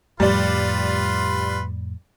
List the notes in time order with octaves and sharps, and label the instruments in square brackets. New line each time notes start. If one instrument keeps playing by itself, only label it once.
[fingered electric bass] F2 A2 [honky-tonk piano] G3 D5 [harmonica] F4 B4 C6